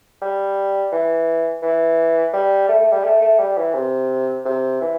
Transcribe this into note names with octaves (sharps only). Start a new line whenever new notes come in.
G3
E3
E3
G3
A3
A3
G3
A3
A3
G3
E3
C3
C3
E3